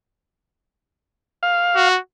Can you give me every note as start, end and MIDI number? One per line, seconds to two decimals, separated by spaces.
1.43 1.89 77
1.75 1.99 66